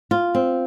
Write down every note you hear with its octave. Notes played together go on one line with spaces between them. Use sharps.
F4
C4